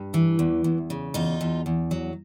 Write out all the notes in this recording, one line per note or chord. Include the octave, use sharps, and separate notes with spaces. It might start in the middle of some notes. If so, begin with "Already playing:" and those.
Already playing: G2
E3
E2
E2
C#3
E2 D#4 F4
E2
E2
F#3